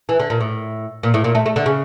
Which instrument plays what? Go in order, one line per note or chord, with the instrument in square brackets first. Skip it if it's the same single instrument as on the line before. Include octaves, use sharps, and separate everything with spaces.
[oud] E3
D3
A#2
A2
A#2
A2
A#2
A3
A3
D3
C#3